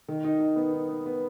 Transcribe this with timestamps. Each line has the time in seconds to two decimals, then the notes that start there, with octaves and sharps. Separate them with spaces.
0.08 D#3
0.24 D#4
0.40 D#4
0.56 B3
0.73 D#4
0.89 B3
1.06 B3